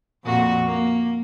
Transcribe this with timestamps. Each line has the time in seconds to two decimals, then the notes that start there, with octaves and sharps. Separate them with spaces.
0.25 F2 A#2 F#4
0.65 A#3